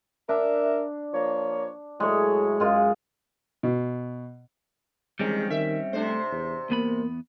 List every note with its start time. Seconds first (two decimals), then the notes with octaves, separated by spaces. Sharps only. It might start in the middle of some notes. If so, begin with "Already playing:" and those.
0.29 D4 A#4 E5
1.14 F3 A#3 C#5
2.00 A2 F#3 G#3 A3 C#5
2.60 F#2 G#3 F4
3.63 B2
5.19 E2 D#3 G3 G#3 C4 C#4
5.50 D#3 E5
5.93 C3 A3 D4 C5
6.31 E2
6.70 E2 A#3 B3 B5